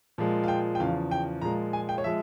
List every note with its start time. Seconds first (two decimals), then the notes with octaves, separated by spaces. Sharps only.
0.18 A#2 F3 G#3
0.43 F5
0.48 G5
0.75 G5
0.80 E2 C#3 F3 F5
1.11 G5
1.41 A#2 F3 G#3 A#5
1.73 G#5
1.89 G5
1.98 C#5
2.04 F3 G#3 E5